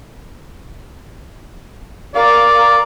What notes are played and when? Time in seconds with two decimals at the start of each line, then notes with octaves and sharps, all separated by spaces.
2.15 A#4 D5 F5